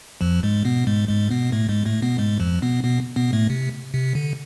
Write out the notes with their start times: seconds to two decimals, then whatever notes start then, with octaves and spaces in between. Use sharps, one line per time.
0.21 F2 F3
0.43 G#2 G#3
0.65 B2 B3
0.87 G#2 G#3
1.08 G#2 G#3
1.30 B2 B3
1.52 A2 A3
1.69 G#2 G#3
1.86 A2 A3
2.02 B2 B3
2.18 G#2 G#3
2.40 F2 F3
2.62 B2 B3
2.84 B2 B3
3.16 B2 B3
3.33 A2 A3
3.50 C3
3.94 C3
4.15 D3